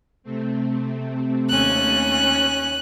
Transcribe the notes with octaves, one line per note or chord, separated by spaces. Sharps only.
C3 A3 C4
D#2 C#4 F#6